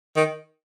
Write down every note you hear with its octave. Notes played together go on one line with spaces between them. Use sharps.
D#3